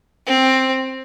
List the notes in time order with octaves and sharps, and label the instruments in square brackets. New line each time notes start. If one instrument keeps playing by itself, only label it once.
[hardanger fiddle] C4